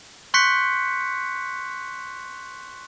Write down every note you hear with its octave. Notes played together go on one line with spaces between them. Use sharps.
C6 C#6 F#6 G6 B6 C#7